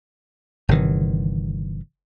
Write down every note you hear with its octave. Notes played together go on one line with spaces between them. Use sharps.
G1 C3 D#3 E3